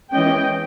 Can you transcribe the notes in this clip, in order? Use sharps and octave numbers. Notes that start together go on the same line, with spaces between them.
E3 G#3 C#4 D#5 G5